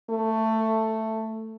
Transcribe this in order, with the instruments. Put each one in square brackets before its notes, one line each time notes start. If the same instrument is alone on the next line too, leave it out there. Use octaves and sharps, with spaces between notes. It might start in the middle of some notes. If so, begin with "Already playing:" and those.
[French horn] A3